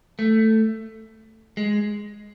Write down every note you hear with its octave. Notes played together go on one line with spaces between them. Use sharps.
A3
G#3